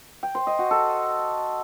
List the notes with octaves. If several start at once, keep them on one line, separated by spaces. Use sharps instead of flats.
G5
C5
D#5
F#4
A4